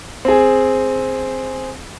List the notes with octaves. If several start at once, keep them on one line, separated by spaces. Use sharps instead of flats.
C4 G#4